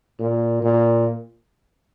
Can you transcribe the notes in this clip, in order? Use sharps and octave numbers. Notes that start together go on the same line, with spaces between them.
A#2
A#2